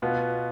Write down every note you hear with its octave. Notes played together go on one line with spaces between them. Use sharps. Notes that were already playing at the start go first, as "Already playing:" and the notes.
B2 B3 F4